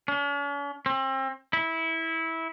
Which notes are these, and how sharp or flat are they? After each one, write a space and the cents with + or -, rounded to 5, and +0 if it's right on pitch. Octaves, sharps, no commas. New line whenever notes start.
C#4 +45
C4 +35
E4 -15